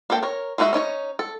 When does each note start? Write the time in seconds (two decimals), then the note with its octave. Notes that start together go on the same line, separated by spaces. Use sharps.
0.10 A#3 D4 A4 G5
0.23 A#4 C#5
0.58 G#3 D#4 F#4 C5 E5
0.73 C#4 D#4 E4 C#5
1.19 A4